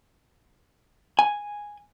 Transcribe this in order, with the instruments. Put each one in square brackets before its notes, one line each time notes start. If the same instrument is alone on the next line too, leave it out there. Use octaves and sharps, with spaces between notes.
[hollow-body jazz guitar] G#5